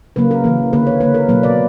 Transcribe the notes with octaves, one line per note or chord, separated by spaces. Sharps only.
C#3 F#3 A#3 B4
A#4
C#3 E3 A#3
D3 A#3 B4
C#5
D3 A#3 B4
A#4
B2 F#3 A#3 B4
D5